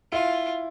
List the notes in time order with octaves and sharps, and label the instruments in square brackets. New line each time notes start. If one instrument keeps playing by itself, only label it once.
[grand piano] E4 [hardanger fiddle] F4